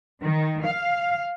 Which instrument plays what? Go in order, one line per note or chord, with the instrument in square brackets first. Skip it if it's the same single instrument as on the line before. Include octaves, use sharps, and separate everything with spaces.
[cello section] D#3
F5